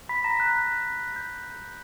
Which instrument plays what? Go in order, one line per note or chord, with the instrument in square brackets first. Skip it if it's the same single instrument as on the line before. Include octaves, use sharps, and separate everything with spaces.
[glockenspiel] B5 B6
A#5 A#6
F#6
G6